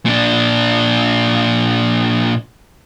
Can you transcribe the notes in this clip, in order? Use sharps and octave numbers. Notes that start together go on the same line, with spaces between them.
A#2 D4